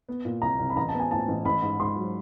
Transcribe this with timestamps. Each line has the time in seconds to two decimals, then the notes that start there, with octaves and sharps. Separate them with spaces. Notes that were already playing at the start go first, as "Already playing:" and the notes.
0.09 B3
0.25 A#2
0.42 C2 A#5
0.59 C2
0.70 B5
0.76 A1 A#5
0.89 A5
0.94 B3
1.00 G#5
1.11 A2 A5
1.28 A1
1.45 A1 B5
1.62 G#2
1.80 G#2 C6
1.96 F#3